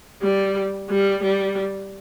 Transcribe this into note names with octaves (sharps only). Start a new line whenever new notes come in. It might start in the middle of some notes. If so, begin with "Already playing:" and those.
G3
G3
G3